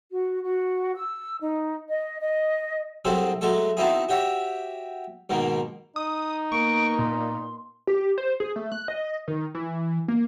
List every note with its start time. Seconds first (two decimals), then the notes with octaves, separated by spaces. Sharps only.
0.11 F#4
0.43 F#4
0.95 E6
1.40 D#4
1.89 D#5
2.19 D#5
3.05 C2 C3 F#3 C4 G#4 A4
3.41 F#3 G#3 A3 A4 C#6
3.77 B3 C4 D#4 E4 F#4 G#4
4.09 F#4 G4 C#5 E5 F#5
5.30 G#2 B2 D#3 A#3
5.96 D#4 D#6
6.52 A#3 B3 C#6 D7
6.99 A#2 C6
7.87 G4
8.18 C5
8.40 G#4
8.56 A3
8.72 F#6
8.88 D#5
9.28 D#3
9.55 E3
10.08 A#3